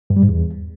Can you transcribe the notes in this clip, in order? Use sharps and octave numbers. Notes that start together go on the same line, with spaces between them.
G2
G3
G#2
E2